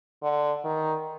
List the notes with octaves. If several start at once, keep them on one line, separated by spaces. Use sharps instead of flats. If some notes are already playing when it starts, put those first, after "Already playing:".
D3
D#3